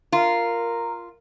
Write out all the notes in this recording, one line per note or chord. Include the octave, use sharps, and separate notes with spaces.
F4 A#4